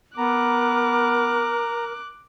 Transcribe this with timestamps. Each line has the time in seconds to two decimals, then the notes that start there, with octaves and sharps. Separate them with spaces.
0.18 B3 A#4 A#5 D6 F#6